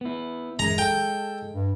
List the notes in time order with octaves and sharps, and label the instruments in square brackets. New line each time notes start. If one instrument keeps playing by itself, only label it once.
[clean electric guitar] B3 E4
[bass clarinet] F#2 [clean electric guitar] G#3 [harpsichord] A#5
[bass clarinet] A4 [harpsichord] G5
[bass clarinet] G2